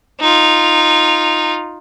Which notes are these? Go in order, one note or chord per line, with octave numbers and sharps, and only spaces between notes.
D#4 F4